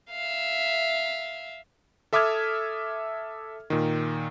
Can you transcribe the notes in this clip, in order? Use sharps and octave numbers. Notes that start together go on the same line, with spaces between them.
E5 F5
A4 E5 D6 D#6 F6 G#6
A#2 D#3